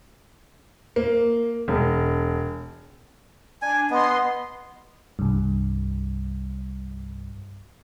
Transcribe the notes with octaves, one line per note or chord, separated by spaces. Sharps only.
A#3
E1
D4 G#5
B3 D#5 C6
C2 G2